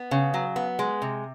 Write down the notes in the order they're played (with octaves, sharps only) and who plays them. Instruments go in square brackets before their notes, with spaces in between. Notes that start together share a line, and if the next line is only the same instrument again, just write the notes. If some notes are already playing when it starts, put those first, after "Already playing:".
Already playing: [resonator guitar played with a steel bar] B3
C#3
F#3
B3
G#3
C3